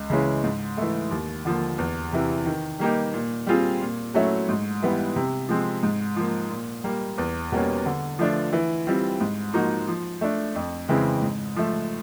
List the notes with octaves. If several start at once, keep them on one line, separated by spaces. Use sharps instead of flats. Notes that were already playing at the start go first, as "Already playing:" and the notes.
Already playing: C#2
C#3 E3 G#3 C#4
G#2
E3 A3
D#2
D3 F3 A#3
E2
C3 E3
D#3
G3 A#3 D#4 G4
A#2
G3 C4 F4 G#4
A#2
F#3 A3 C#4 E4
G#2
E3 G3 B3
C3
F3 G#3 C4
G#2
F3 A#3
A#2
G3 A#3
E2
B2 G3 A#3 C#4
D3
F3 A3 D4 F4
E3
G3 C4 F4
G#2
F3 A#3 D#4 F#4
F3
A3 D4
F2
C#3 E3 G#3 C4
G#2
F3 A3